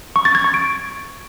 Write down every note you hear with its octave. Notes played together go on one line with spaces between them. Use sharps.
C#6
A6
G#6
C#6
D7